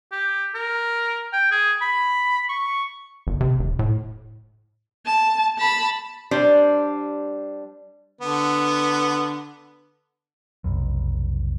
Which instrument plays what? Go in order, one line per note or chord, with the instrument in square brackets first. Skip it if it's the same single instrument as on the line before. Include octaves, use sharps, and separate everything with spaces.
[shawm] G4
A#4
G5
G#4
B5
C#6
[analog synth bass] G1
C3
E1
A2
[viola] A5
A5 B5
[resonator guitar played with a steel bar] G3 D4 C5
[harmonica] D3 B3
[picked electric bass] F1 B1